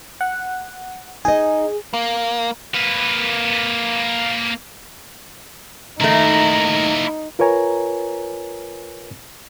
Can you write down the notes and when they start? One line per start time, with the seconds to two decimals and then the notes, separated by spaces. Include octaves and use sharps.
0.21 F#5
1.25 D#4 G#4 D#5
1.94 A#3
2.75 A#3 B4
6.00 D#3 A3 A#3 D#4 E4 A#5
7.39 F4 A#4 B4 C#5 G#5 A#5